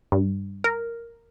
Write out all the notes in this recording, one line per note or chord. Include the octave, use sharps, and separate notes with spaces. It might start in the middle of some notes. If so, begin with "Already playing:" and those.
G2
A#4